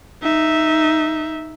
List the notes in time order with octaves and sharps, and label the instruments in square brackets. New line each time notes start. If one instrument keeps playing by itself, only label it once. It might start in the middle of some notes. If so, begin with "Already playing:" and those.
[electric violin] D#4 E5